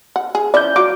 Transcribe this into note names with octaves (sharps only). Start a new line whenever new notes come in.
F#5
G#4
F3 C#4 E4 D5 G6
F#3 F4 D6